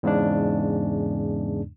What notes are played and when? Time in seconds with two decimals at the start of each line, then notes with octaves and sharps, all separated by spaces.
0.03 E2 G#2 C#3 G#3 D4